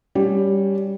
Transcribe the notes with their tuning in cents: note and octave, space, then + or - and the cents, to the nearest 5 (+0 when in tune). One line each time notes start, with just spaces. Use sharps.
G3 +0 C#4 +15